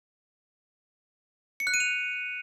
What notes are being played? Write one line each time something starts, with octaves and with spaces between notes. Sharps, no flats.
C#7
F#6
D#7
F7